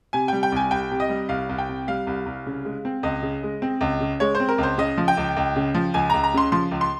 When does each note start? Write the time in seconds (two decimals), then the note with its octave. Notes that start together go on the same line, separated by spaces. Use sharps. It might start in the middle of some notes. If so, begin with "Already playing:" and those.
0.13 C3 G#5
0.28 G3 G5
0.43 G5
0.52 C2 G#5
0.71 C2 G5
0.91 C3
1.00 D#5
1.09 G3
1.29 C2 F5
1.49 C2
1.58 G5
1.69 C3
1.88 G3 F5
2.07 C2
2.26 C2
2.46 C#3
2.65 G#3
2.85 C4
3.03 C#2 D#5
3.23 C#3
3.43 G#3
3.62 C4
3.81 C#2
4.00 C#3
4.20 G#3 C#5
4.35 C5
4.40 C4
4.49 A#4
4.58 C#2 C5
4.78 C#3 D#5
4.98 F3
5.08 G5
5.17 C#2
5.37 C#2
5.56 C#3
5.74 F3
5.94 C#2 G#5
6.10 C#2 A#5
6.24 A#5
6.34 C#3 C6
6.52 F3 C6
6.71 C#2
6.81 C6